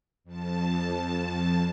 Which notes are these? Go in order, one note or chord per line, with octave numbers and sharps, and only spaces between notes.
F2 A5